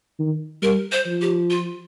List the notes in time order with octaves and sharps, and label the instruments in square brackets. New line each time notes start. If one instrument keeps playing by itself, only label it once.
[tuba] D#3
[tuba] G3 [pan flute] A#4
[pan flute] C5
[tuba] F3
[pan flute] G4
F4